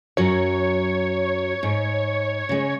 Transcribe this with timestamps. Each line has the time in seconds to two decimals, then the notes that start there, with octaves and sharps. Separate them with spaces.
0.17 F#2 F#3 C#5
1.63 G#2
2.49 C#3 G#3